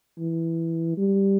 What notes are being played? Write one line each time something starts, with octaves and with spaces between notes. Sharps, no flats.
E3
G3